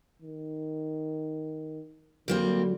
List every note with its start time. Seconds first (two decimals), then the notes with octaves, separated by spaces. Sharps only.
0.22 D#3
2.28 D3 F#3 G3 A#3 C4